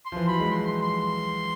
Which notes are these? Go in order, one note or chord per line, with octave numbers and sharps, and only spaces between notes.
C6
F3
E3
F#3 B5
G#3
C6
C6
C6